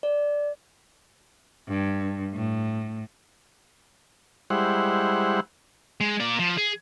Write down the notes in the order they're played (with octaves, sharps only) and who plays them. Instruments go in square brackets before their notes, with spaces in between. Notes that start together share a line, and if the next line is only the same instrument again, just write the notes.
[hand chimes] D5
[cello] G2
A2
[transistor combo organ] G3 G#3 E4 C5 F#5
[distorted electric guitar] G#3
A#3 D5
F3
G#4